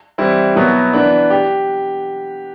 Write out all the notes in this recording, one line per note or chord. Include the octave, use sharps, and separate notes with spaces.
E3 G3 C4 E4
B2 F#3 B3 E4
E3 B3 D4
G4